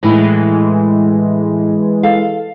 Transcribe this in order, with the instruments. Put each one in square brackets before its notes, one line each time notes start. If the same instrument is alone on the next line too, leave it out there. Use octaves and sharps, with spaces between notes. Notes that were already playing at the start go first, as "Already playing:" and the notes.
[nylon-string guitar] A2 E4 [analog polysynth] E3 G#3
[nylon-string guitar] A4 F5